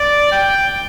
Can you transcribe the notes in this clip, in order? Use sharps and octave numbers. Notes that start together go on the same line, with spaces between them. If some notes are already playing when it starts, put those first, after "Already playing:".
Already playing: D5
G5